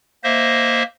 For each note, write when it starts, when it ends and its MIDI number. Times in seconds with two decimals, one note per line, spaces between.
0.24 0.83 58
0.24 0.83 72
0.24 0.83 75
0.24 0.83 76